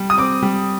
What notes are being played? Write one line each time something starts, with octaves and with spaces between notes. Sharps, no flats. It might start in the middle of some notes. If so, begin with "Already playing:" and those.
Already playing: G3
D#6
C4 D6
G3